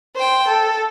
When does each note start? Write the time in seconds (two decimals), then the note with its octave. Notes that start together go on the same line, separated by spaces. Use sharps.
0.15 C5 G5
0.48 A4